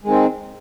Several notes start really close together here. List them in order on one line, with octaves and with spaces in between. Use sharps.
G#3 D#3 C4